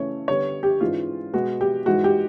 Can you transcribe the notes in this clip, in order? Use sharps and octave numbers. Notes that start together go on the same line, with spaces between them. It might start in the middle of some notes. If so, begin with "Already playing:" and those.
Already playing: C#3 E3 A3 C#4 C#5
D3 G3 B3 C#5
G4
G#2 E3 G#3 C#4 F4
B2 G#3 B3 F#4
G4
G#2 E3 G#3 F#4
G4